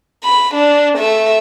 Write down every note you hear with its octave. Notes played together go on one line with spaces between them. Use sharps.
B5
D4
A3 E5